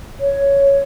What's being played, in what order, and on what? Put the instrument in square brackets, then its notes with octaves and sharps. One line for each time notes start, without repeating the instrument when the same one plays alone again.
[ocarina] C#5